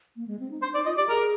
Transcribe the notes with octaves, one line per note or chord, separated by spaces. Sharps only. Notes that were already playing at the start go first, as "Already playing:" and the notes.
A#3
G#3
C4
D#4
D4 C5
D#4 D5
F4 D#5
G4 D5
G#4 A#4